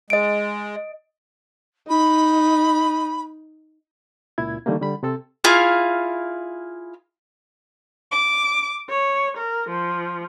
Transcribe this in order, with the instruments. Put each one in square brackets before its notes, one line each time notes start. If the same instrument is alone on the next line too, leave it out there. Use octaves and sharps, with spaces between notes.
[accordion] G#3 [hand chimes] D#5 D7
[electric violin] D#4 [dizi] B5
[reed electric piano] C#2 A#2 E4 G#6
D3 D#3 G3 A3 A#3
D3 G3 B5
C3 C4 A4 E6
[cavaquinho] E4 F4 G#4 F5
[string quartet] D6
C#5
A#4
F3